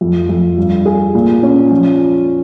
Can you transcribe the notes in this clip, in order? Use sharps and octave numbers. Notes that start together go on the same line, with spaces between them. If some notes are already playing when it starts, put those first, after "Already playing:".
F2
F2
G2
G#4
A#2
C#4
F3